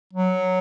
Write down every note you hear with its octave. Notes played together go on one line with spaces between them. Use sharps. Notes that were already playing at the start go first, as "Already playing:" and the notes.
F#3